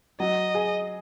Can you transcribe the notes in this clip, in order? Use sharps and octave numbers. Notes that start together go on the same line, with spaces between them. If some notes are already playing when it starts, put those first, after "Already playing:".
F#3 D#5
G#4